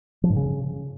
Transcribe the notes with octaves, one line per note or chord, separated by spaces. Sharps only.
F3
G#2
C#3